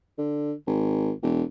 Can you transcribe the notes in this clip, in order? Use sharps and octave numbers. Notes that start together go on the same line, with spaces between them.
D3
G#1
E1